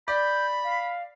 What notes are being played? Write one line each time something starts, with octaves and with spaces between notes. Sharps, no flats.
D5 B5 G6
F5